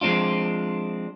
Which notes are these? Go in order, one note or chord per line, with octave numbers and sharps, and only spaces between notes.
F3 G#3 C4 D4 F4